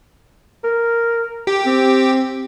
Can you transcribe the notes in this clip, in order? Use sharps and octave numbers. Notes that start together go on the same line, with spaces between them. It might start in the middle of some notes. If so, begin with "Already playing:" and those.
A#4
G4
C4